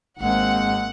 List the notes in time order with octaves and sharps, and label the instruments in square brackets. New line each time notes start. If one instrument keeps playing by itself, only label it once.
[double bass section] G#1 A#3 C4 [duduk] G#3 [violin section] F#5